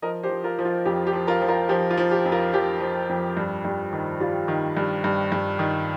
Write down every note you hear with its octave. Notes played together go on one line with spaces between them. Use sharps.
F3 A#4 D#5
G4 C5
F3
F4 A#4
F3
F4
F2 G4
G4
F3
F4 A#4
F3
F4 A#4
F3 G4
F4
F3
G4
F2
F4 A#4
F3 G4
F3
F2
G2
G2
D#3
G3 F4
D#3
G2
G2
G2
D#3